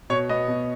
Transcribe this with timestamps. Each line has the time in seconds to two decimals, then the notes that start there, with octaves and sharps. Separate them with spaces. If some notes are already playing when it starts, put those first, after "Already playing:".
0.10 B2 C#5
0.29 B3 D#5
0.48 B2